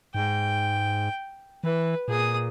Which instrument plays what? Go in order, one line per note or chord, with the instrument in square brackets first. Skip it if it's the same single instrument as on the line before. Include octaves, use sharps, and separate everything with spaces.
[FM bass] G#2 [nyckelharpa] G5
[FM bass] E3 [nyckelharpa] B4
[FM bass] A#2 [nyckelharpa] G#4 D#6